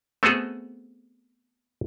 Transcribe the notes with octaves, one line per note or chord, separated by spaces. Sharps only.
A3 B3 C4 F#4 G#4 A4